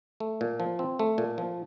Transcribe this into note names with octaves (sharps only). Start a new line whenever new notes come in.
A3
A#2
F3
C4
A3
A#2
F3